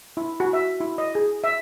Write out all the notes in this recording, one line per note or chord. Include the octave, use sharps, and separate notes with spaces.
E4
F#4
E5
E4
D#5
G#4
E5